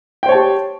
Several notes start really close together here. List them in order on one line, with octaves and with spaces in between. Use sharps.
G5 C5 C#5 A5 G4